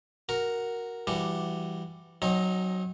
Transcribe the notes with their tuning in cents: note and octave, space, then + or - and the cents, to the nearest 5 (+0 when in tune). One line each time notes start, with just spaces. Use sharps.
F#4 +0 A#4 +0
E3 +25 G3 +0 F#4 +0
F#3 +0 C4 +40 D#4 +0